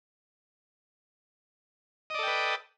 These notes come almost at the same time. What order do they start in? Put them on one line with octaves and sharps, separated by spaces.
D#5 D5 A4 G5 B4